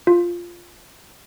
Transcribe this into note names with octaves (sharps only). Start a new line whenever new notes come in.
F4